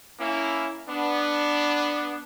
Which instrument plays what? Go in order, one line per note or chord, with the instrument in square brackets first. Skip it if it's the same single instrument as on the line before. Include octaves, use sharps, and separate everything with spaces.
[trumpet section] A#3 C#4 E4
B3 D4